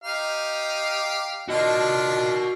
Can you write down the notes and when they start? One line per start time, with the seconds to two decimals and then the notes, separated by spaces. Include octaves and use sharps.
0.04 D#4 G4 F5
1.49 D#3 D4 F4 F#4 D#5